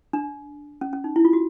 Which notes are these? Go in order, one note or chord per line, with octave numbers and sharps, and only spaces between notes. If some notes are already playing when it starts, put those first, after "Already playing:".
D4
C#4
C#4
D#4
E4
F4
F#4